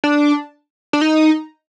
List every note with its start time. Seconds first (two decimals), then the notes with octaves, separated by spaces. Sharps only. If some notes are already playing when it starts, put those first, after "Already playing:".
0.04 D4
0.93 D4
1.01 D#4